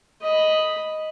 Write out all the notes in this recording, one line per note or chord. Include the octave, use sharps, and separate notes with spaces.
D#5 B5